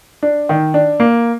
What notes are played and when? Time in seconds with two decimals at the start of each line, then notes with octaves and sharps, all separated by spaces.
0.23 D4
0.49 D#3
0.74 D4
1.00 A#3